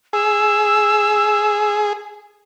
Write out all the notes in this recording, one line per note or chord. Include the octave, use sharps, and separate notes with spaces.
G#4 E6